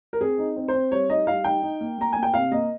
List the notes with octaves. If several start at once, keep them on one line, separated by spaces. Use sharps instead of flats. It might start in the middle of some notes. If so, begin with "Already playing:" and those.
A#4
C4 G#4
D#4
C4
C5
C4
G3 C#5
D#4 D#5
G3 F5
D#4 G5
D#4
A#3
A#3 A#5
A#3 G#5
G5
C3 F5
A#3 D#5